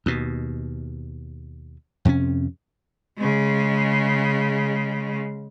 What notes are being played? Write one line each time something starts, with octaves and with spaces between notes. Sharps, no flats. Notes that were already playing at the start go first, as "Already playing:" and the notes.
D#2 B2
F2 C3 A#3 C#4
C#3 G#3